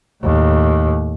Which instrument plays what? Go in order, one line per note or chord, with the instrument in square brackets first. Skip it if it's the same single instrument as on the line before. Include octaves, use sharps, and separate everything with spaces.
[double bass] D#2 A2